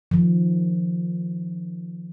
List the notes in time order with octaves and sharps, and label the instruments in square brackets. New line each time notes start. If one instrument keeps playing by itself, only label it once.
[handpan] D#3 F3